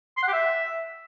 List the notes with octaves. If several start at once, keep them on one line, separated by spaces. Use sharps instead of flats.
C6
F#5
G4
E5